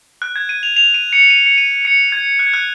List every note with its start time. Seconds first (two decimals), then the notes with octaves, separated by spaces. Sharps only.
0.22 F#6
0.36 G#6
0.49 D#7
0.63 F7
0.76 F7
0.94 D#7
1.13 C#7
1.30 D#7
1.46 C#7
1.58 D#7
1.85 C#7
2.12 G#6
2.39 F#6
2.46 G#6
2.54 F#6